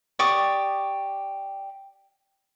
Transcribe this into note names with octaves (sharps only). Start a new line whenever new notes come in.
G4 D5 C#6 D#6